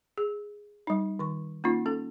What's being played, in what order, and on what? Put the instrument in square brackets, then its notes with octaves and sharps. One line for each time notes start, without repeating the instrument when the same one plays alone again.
[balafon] G#4
G3 D#4
D#3 C#6
A#3 C#4 D#4 F4
C#4 A4